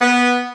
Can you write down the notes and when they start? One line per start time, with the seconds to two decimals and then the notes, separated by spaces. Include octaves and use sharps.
0.02 B3